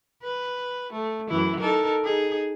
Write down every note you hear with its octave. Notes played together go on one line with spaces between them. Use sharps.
B4
A3
F#2 E3 E4
D#4 A4 A#4
D#4 G#4